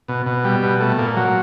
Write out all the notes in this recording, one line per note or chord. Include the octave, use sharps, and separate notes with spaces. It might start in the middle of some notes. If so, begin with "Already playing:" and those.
B2
B2
G3
B2
A3
A#2
F#3